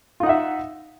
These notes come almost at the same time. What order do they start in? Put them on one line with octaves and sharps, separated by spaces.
F4 D#4 F#5 E5